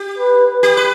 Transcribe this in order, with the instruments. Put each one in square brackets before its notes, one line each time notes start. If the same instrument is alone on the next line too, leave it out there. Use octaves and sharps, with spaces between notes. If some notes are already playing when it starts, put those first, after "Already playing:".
Already playing: [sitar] G4
[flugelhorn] B4
B4
[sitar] G4
B4